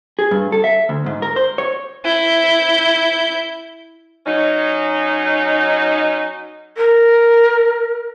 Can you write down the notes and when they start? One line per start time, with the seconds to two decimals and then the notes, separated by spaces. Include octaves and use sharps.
0.19 G#4
0.31 G2
0.52 A4
0.64 E5
0.89 D2
1.06 G#2
1.22 A#4
1.36 C5
1.58 C#5
2.05 E4 G6
4.26 F#3 C#4 D#4
6.77 A#4